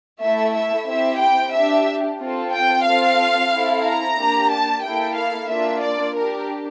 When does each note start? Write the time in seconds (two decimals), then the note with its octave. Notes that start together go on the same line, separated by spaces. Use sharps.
0.22 A3 E4 A4 E5
0.55 E5
0.88 C4 E4 G4 E5
1.20 G5
1.54 D4 G4 E5
2.20 C4 F4 A4
2.53 G5
2.85 C4 F4 A4 F5
3.52 C4 E4 A4
3.84 A#5
4.17 A#3 D4 G4
4.51 A5
4.83 A#3 E4 A4 G5
5.16 F5
5.49 A#3 D4 F4 E5
5.82 D5
6.15 D4 G4 A#4